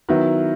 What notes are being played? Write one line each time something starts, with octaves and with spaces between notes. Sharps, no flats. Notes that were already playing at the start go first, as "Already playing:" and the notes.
D#3 F#3 B3 E4